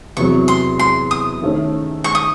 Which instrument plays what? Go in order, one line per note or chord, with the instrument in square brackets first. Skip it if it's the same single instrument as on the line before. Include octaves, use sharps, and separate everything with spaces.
[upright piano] E2 C3 F#3 [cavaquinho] C#6
[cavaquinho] C6
C6
D#6
[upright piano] D#3 A3 C#4
[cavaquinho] C#6
D#6